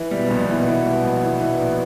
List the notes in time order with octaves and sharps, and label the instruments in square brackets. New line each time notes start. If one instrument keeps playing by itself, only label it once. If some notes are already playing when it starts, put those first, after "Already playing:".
Already playing: [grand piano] E3
[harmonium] B2 B3 [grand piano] G3
[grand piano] A#1
[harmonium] B2 B3 [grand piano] E3
[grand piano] E3
G3
A#1
E3
E3
A#1